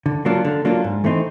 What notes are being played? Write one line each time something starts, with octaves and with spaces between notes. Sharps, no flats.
D3
F#3 A#3 D4 F4
D3
F#3 A#3 D4 F4
G#2
E3 A3 C4 D#4